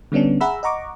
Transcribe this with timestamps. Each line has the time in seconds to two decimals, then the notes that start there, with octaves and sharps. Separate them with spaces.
0.12 D3 G3 B3 C#4 D4
0.41 G#4 E5 F#5 A#5 B5 E6
0.63 D#5 F#5 A#5 C#6 D6